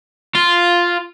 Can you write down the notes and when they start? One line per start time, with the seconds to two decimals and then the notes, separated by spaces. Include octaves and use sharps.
0.35 F4